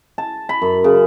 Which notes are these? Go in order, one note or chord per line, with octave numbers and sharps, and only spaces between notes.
A5
B5
F#2
C#3